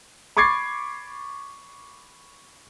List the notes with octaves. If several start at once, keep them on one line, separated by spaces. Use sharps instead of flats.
B5 C#6 D6 G#6 A6 C7